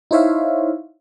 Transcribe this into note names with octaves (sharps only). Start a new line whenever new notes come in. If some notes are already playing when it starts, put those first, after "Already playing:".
D#4 E4 C5 C#5 E5 F5